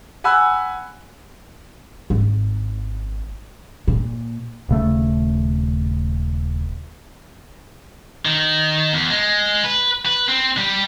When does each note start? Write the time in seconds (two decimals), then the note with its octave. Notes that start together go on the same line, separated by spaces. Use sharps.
0.24 F#5 G#5 B5 E6 F#6
2.10 G#1
3.88 A#2
4.69 D#1 C#3 A3
8.25 D#3
8.93 E2
9.10 G#3
9.63 B4
10.06 B4
10.28 C4
10.57 G3